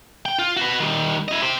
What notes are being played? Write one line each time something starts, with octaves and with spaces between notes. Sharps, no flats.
G5
F4
F#4 B4
D#3 G3
E4 D#5
G4 C5